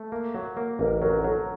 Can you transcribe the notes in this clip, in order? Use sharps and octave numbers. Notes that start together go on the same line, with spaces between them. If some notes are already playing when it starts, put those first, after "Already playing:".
Already playing: A3
A#3
F#3
A#3
A1 A#4
F#3 A#4
F#3 A4